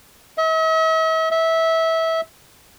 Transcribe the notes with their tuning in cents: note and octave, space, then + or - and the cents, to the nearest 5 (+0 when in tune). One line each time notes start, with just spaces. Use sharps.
E5 -45
E5 -20